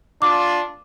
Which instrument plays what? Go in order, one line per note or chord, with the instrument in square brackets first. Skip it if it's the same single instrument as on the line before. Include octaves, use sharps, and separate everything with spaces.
[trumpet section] D4 F4 [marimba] D6